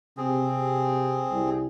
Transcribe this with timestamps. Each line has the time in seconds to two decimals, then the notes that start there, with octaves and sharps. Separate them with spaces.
0.17 C3 C4 G#4
1.30 C2